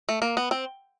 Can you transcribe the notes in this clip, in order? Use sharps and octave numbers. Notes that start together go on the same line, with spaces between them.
A3
A#3
B3
C4